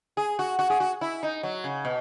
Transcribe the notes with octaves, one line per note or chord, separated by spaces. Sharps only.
G#4
F#4
F#4
G#4
F#4
E4
D#4
F#3
C#3
B2